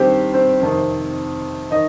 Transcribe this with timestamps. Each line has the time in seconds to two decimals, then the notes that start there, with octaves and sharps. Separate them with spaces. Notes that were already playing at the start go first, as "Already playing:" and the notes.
Already playing: G2 D#3 C4 G4 C5
0.34 C4 C5
0.61 F2 C3 D#3
1.71 D#3 D#4 D#5